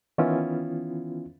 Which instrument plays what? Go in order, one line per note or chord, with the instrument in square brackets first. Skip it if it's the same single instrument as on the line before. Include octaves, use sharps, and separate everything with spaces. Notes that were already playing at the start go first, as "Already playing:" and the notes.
[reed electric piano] D#3 E3 B3 C#4 E4 F4